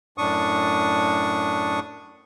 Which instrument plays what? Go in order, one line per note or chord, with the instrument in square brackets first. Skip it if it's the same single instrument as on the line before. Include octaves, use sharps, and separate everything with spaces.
[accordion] F#2 A2 D4 C#6 D#6